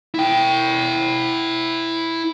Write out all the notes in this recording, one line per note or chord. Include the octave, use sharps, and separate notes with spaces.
E4 G5